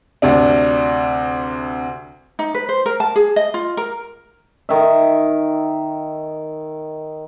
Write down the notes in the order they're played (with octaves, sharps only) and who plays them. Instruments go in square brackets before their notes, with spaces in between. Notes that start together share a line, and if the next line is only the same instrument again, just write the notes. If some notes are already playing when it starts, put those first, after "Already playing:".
[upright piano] D2 C3 D4
[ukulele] D#4
B4
C5
A#4
A5
G#4
D#5
F4
A#4
[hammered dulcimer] D#3 E5